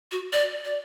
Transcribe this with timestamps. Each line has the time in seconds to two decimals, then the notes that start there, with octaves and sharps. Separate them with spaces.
0.12 F#4
0.33 D5
0.65 D5